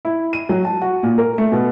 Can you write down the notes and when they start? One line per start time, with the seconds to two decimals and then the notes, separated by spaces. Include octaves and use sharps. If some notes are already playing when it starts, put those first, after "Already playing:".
0.05 E4
0.33 D#7
0.49 F#3
0.65 A5
0.82 F#4
1.03 A#2
1.18 A#4
1.38 A3
1.52 B2